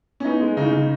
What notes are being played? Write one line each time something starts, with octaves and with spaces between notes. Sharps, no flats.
C#4
B3 D#4
G#3
C#3 D#4
C#3